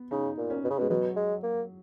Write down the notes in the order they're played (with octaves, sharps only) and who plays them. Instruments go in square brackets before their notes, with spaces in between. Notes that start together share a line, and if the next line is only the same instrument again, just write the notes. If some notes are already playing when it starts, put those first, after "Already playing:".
Already playing: [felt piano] B3
[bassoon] C#3 [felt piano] D#4
[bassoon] A#2
[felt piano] C#4
[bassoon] B2
C#3
[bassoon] B2 [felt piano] G#3
[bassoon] B2 [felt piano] F#3
[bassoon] G#3
A#3